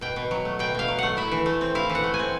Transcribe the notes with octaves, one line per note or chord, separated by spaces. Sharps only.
B2 G5
B2
F#3
A3
B2 G5
B2 F5
F#3
A3 F#5
E4 E5
E3
A3
C4
E4 F5
E3
F#5
A3
G#5
C4